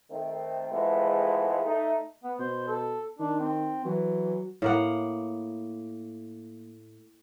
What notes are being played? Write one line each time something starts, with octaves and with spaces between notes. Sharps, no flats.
D#3 A3 C4
F2 G#2 E3 G#3 A3 B3
A3 D#4
B3
B2 C5
A4
D#3 D4
C4
E3 F#3
A2 A#3 F#5